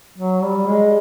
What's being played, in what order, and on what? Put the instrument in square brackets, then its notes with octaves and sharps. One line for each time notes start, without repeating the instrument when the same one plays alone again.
[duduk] F#3
G3
G#3